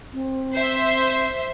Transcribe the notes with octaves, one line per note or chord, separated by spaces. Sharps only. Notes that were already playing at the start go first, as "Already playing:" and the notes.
C4
C5 E5